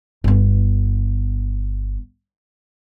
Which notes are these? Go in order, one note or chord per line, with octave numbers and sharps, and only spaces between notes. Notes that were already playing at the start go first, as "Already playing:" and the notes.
G1 B3